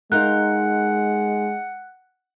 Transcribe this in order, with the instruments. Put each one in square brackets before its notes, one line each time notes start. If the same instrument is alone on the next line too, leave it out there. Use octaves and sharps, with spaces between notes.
[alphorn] G#3 [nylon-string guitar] D#4 F4 A#4 [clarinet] F#5 [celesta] F#6